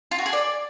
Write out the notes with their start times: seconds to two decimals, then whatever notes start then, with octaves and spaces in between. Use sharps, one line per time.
0.11 F4
0.19 F#4
0.26 G#4
0.33 D5